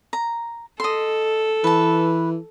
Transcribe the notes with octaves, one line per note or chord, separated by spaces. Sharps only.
A#5
A4 D#5 C6
E3 B4 A5